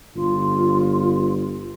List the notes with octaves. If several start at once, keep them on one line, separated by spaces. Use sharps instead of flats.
G1 F4